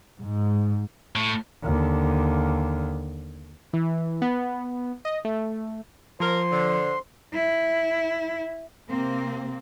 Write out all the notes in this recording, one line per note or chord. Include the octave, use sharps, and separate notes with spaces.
G#2
A2
D#2 D3
E3
B3
D#5
A3
F3 A#4 C5 C6
D3
E4
C3 A#3 C4